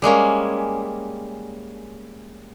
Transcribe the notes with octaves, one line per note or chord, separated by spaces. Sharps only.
G3 G#3 A#3 C#4